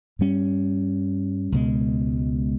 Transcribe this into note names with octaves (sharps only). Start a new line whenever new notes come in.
G2 G3 C#4
C#2 B2 G#3